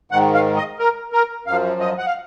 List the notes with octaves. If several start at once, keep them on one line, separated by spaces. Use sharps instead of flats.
G#2 D#3 F#5
F5
D#5
A#4
A#4
F#2 F3 F5
D#5
F#5
F5